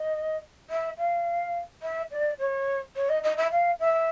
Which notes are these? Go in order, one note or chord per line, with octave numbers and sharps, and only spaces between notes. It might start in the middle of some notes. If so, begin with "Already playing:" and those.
Already playing: D#5
E5
F5
E5
D5
C#5
C#5
D#5
D#5
E5
F5
E5